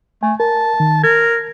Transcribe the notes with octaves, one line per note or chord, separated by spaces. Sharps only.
A3 G#5
A#4 A5
D#3
A#4 G#6